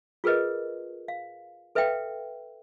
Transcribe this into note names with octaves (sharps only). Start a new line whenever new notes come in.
F4 G#4 A#4 B4 D#5
F5
A4 B4 E5 F5 G5